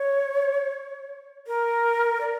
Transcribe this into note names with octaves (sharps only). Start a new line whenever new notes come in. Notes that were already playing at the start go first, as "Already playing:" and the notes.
Already playing: C#5
A#4
D5